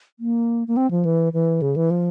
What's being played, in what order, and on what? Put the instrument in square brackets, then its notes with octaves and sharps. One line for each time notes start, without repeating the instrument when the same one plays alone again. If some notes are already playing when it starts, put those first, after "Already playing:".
[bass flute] A#3
A#3
C4
F3
E3
E3
C#3
E3
F3